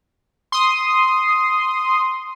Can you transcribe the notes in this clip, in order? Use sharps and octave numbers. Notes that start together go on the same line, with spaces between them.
C6 D#6